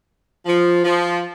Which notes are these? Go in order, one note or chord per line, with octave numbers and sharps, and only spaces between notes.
F3
F3